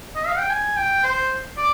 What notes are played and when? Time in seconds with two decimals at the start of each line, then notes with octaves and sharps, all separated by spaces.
0.16 D#5
0.27 F5
0.38 G5
0.50 G#5
0.77 G5
1.03 C5
1.57 D5